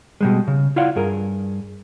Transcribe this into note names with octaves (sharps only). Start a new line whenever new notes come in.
B2 G3 G#3
C#3
E4 F4 C#5 D5 F5 F#5
G2 G#4 A#4